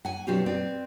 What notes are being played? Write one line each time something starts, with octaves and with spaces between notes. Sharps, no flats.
F#5 G#5
B2 F#3 C4 D4 F4 G4
C4 B4 D5